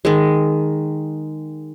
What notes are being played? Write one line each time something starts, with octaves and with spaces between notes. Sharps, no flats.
D#3 G#3